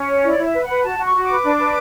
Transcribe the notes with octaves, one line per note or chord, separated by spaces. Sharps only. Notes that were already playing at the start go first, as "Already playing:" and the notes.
Already playing: C#4
C#5
E4 D5
E4
E5
B4
B4 F#5
F#4 A5
F#4
C#6
F#4
D6
B4
D4
B4